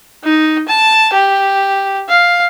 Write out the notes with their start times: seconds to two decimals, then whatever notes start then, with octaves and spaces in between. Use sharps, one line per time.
0.24 D#4
0.68 A5
1.13 G4
2.09 F5